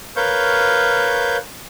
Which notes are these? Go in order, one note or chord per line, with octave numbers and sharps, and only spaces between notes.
A#4 B4 C#5 F5 C#6 G6